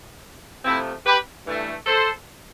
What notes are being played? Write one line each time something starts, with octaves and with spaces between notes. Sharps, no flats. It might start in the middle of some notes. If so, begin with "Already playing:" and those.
C3 F3 A3 C4 E4
G4 B4
G2 E3 A3
A4 C5